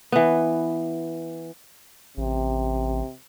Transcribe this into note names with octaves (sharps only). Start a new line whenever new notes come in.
E3 B3
A1 C3